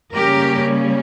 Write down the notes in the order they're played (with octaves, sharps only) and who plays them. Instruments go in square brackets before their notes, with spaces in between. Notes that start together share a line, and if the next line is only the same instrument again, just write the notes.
[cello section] C#3 G3 A#3 C#4 G4 A#4